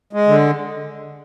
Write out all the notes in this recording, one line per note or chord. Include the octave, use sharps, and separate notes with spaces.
G#3
D3